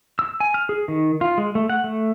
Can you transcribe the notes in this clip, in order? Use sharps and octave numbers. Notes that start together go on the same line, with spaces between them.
E6
G#5
F6
G#4
D#3
F4
G#3
A3
F#5
A3